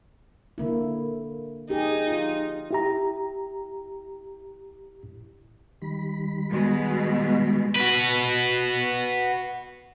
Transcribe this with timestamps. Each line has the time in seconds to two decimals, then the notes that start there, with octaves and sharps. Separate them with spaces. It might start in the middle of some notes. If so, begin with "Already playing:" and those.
0.58 D3 A#3 E4
1.70 D#4 G4 G#4
2.08 F4
2.71 E4 G4 A#5
5.82 D#3 G3 B5
6.51 B2 G#3
7.76 F#4 B4